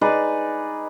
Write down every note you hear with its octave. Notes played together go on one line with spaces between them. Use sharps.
D#4 G#4 B4 D5